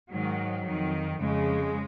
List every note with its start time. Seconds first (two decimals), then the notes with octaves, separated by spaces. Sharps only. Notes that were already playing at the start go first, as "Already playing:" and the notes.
0.11 G#2 D#3 F#3
0.65 F2 D#3
1.20 F2 C#3 G#3